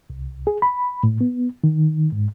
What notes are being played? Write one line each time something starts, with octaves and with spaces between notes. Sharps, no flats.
C2
G#4
B5
A2
B3
D#3
G#2